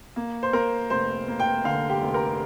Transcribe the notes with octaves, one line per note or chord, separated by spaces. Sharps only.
A#3
C5
A#3 A#4
F1 C5
A#3
G5
D3 F5
G4
F1
A#4